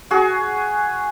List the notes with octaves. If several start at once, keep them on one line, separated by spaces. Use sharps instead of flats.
F#4 G#4